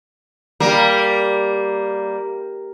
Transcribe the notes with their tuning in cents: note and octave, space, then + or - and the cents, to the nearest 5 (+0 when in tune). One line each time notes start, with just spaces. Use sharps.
G3 +0 A#3 +0